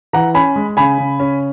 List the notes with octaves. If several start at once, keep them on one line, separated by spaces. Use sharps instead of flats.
E3 F#5 A#5
C#4 G#5 B5
G#3
C#3 G#5 B5
C#3
C#4